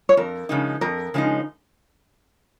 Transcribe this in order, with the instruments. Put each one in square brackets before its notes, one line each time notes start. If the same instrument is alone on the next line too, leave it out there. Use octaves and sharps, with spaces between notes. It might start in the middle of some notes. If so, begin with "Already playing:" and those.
[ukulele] C#5
[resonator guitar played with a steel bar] F2 [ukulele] A#4
[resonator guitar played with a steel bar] C#3 F3 G#3 D#4
[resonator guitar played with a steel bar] F2 [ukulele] A#4
[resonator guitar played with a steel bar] C#3 F3 G#3 D#4